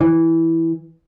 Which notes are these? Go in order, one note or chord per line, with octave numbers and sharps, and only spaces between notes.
E3